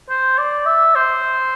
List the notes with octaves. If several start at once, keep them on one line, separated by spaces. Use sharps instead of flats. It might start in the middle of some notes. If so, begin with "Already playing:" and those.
C5
D5
E5
C5